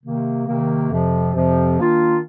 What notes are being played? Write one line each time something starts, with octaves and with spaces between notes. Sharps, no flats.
C3 D#3 A#3
C3 D#3 A#3
F2 C3 F3
F2 C3 F3
D#3 A#3 D4 F4